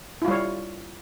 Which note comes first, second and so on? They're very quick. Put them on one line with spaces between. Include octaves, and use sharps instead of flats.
E4 F4 G3 C#5